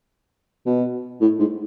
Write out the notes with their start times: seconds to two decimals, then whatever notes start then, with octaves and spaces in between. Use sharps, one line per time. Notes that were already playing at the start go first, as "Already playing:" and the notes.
0.66 B2
1.21 A2
1.39 G#2